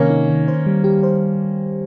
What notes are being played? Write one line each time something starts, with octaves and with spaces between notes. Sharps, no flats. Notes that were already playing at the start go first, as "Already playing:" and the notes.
Already playing: C3 D#3 A#3 C#4
D#4
D#3
C5
G3
G4
C5